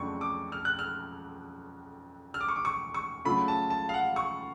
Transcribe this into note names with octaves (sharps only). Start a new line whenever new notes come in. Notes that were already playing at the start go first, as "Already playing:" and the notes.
Already playing: F2 C#3 F#3 A3 D4 C#6
D6
F6
F#6
F6
F6
D6
C#6
D6
C#6
C#6
C#3 F#3 A3 F4 B5
A5
A5
F5
F#5
C#6